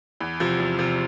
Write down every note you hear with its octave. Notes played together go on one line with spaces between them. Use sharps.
E2
C3 F3
E2
C3 F3